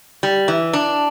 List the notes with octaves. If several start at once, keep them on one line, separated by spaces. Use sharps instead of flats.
G3
E3
D4